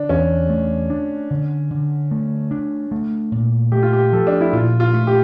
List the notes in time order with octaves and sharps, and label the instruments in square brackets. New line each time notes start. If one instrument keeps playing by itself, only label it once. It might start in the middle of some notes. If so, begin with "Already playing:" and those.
Already playing: [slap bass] D3 [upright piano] D4
[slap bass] E2 [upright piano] C#4
[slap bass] A3
D4
D3
D3
A3
D4
A3
A#2
[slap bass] A3 [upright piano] G4
[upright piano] F4
G4
[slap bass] F3 [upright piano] A4
[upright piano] D4
E4
[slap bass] A#2 [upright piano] F4
[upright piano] F4
[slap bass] A3
[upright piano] G4